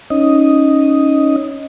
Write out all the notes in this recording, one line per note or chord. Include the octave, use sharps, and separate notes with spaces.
C#4 D#4 D#5